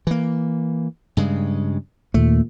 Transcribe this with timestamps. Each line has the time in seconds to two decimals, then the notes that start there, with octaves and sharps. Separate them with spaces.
0.07 E3 A#3
1.17 G2 C#3 G#3
2.14 D#2 A#2 A3